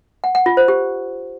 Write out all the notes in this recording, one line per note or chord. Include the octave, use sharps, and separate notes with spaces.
F#5
F#5
F4
C5
G4